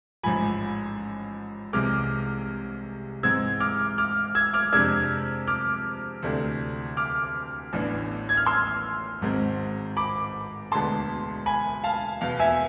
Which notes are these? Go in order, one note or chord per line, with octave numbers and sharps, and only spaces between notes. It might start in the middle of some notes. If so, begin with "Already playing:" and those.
A1 G#2 F3 G#5 B5
C2 C3 E3 G#3 D6 F6
G#2 E3 G#3 C4 E6 G#6
D6 F6
D6 F6
E6 G#6
D6 F6
F2 C3 G#3 D4 E6 G#6
D6 F6
D2 C3 E3 A3 D4
D6 F6
A1 A2 E3 B3 D4
G#6
F6
C6 E6
G#1 G#2 G#3 C4
B5 D6
E1 D2 D3 G#3 B3 A5 C6
G#5 B5
F5 A5
E2 B2 B3 F5
E5 G#5